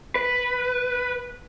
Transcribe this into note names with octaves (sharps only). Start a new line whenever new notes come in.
B4